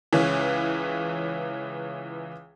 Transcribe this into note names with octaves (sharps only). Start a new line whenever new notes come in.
C#2 E3 C#4